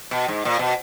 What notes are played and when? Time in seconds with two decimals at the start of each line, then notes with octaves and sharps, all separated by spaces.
0.11 B2
0.28 G#2
0.45 A#2
0.59 B2